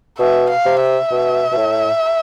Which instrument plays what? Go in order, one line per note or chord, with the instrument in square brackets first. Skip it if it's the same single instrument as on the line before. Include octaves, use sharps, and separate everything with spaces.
[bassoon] B2 [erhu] E5
[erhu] F5
[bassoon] C3
[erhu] E5
[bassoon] B2
B2
A2